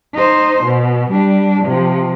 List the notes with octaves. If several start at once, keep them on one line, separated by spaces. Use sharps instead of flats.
D#4 C5
B2
G3 D4
C3 F3